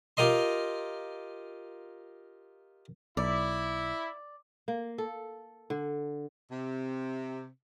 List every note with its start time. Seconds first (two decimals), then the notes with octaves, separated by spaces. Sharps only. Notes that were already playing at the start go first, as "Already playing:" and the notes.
0.17 F4 G4 A#4 D#5 C6
3.17 B1 E4 D5
4.68 A#3
4.98 A4
5.70 D3
6.51 C3